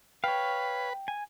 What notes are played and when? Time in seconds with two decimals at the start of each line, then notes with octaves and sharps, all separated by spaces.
0.24 B4 C#5 F5 G5
1.08 G#5